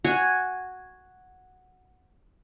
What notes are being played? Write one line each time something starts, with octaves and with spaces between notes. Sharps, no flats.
F#4 C#5 G#5